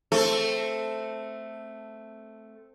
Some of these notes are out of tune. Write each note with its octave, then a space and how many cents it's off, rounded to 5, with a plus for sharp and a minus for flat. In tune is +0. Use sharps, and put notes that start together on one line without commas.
A3 +0 C4 +0 A4 +0